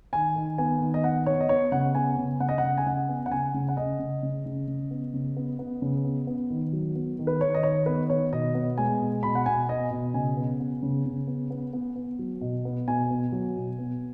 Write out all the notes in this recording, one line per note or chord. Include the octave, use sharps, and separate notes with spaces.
D#3 G#5
D#3
B3 G#5
D#3
D#5
B3 F#5
B3 C#5
D#5
B3 C#5
C#3 F#5
B3 G#5
C#3
C#3 F#5
D#5
F#5
C#3
G#5
C#3 F#5
B3
F#5
C#3 G#5
C#3
F#5
C#3 D#5
C#3
C#3
C#3
C#3
B3
C#3
B3
B3
C#3
B3
B3
D#3
F#3
B3
D#3
B4
D#3 C#5
D#5
D#3 C#5
B3 B4
D#3 C#5
B2 D#5
B3
G#3 G#5
B2
B2 B5
F#5
B2 G#5
B3 D#5
B2
C#3 G#5
B3
B3
C#3
C#3
B3
B3
B3
B3
F#3
B2
B3
B2 G#5
B3
F#3
B2
B3